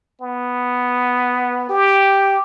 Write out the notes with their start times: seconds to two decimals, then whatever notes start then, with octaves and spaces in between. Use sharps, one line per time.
0.21 B3
1.69 G4